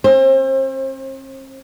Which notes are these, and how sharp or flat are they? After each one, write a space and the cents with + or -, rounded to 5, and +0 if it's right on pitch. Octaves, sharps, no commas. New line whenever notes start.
C4 +45 C5 +30